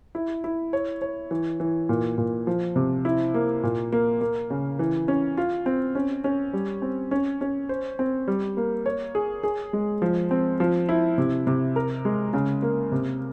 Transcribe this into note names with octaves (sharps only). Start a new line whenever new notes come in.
E4
E4
C#5
C#5
E3
E3
A#2
A#2
F3
C3
E4
A#3
A#2
A#3
A#3
C#3
E3
C#4
F4
C4
C#4
C#4
G3
C4
C#4
C#4
C5
C4
G3
A#3
C#5
G#4
G#4
G#3
F3
C4
F3
E4
C3
C3
A#4
G#3
C#3
A#3
C3